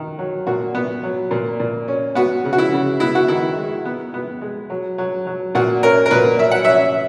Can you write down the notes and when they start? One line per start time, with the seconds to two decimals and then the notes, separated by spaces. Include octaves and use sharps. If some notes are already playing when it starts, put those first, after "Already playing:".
Already playing: D#3
0.19 F#3
0.47 A#2 F#4
0.75 B3
1.03 F#3
1.31 A#2
1.60 A#2
1.88 C#4
2.15 B3 F#4
2.45 C#3
2.53 F#4
2.58 E4
2.72 C#3
3.00 B3 E4
3.15 F#4
3.28 D#3 E4
3.57 G#3
3.85 B3
4.14 B3
4.41 G#3
4.70 F#3
4.98 F#3
5.27 F#3
5.55 A#2 F#4
5.83 C#4 A#4
6.06 A#4
6.11 A#2 B4
6.39 F#3 E5
6.51 F#5
6.65 C#4 E5